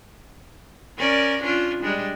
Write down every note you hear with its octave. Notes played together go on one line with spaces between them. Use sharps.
C#4 A#4 D5
C#4 D4 F4
G3 G#3 D4